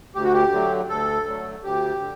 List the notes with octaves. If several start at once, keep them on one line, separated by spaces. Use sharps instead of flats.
D2 G4
F#4
G4
D3 F#3 A3
D2 A4
D3 F#3 A3
D2 G4
D3